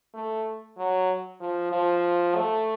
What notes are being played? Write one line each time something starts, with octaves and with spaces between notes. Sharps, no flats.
A3
F#3
F3
F3
A3